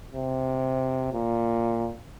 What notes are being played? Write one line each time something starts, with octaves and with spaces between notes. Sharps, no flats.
C3
A#2